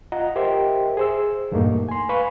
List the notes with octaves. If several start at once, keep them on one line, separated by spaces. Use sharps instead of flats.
F4 D#5 F#5 A#5
G4 A#4 C5 D#5 E5 G5
G#4 C5 E6
E2 G2 A#2 A3 A#3 D#4
G#5 C6
B4 F5 G#5 B5 C#6